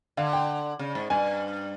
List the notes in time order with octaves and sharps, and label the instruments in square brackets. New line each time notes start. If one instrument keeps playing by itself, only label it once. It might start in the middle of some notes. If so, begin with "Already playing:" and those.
[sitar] D3 [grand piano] F5
[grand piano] G5
[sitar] C#3
G#2
[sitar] G2 [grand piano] G#5